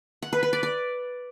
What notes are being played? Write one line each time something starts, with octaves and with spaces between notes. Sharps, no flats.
F#5
B4
B4
D5
D5